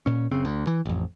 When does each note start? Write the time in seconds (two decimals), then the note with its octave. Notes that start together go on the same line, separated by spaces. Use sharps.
0.06 A#2 C#4
0.31 F#1 C#3 C4
0.45 D2
0.67 E3
0.85 A1 F2